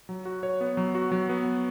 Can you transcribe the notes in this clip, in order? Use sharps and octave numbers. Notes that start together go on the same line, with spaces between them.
F#3
F#4
C#5
B3
F#3
F#4
F#3
B3